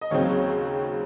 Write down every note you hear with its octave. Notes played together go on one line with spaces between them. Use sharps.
D#5
D#2 C#3 F#3 C4 C#5